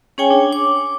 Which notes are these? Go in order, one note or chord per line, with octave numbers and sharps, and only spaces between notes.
C#4 G#4 C#5 G5 G#5
D4
D6